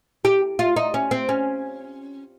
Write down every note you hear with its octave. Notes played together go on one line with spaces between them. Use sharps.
G4
F4
D#4
C#4
C4
C#4